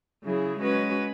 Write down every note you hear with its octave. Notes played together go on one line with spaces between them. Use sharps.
C#3 F#3 E4 G#4
G#3 C#4 F#4 B4